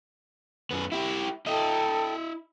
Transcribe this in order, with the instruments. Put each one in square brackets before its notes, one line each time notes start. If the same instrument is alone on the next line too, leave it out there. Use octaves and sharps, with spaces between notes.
[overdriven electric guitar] F#2 B3
E4 G4
[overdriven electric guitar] E4 D#5 [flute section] A4 G5